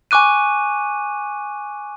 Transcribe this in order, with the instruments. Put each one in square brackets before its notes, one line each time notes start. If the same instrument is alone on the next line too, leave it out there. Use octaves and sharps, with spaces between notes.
[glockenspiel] G#5 C#6 D6 F#6 D#7